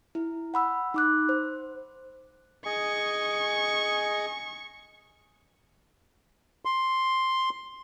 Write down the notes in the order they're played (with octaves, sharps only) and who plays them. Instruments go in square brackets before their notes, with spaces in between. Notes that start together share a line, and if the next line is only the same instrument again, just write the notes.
[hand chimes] E4
F#5 B5 E6
D#4 D6 F#6
C5
[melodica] G#4 D#5 G#5 [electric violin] C#6
[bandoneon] C6